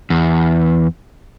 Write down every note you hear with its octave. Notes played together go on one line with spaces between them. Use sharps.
E2